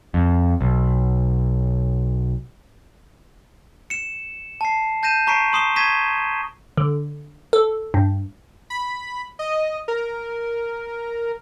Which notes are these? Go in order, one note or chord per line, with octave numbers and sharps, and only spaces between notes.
F2
B1
C#7 E7
A5 C7
A5 G6 A#6 D#7 E7
A5 A#5 C#6 B6 C7 D7
C6 C#6 D#6 C7 E7 G7
C#6 G#6 A#6 B6 D#7 E7
D3
A4
G2
B5
D#5
A#4